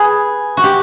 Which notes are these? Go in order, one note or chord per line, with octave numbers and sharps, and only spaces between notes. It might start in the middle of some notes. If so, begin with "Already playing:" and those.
Already playing: G#4 B4
F#4
G4